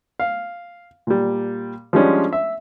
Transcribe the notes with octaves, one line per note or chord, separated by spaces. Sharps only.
F5
A#2 G3
F3 G3 G#3 C#4 D4
E5